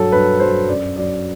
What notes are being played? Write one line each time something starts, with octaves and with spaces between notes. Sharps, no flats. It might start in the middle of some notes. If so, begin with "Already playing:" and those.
Already playing: G2 F#3 A4
G2 B4
F#3 C5
F#2 D5
F#3 D5